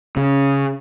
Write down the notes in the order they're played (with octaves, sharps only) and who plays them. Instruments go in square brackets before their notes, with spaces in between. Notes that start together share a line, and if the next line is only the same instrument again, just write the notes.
[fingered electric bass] C#3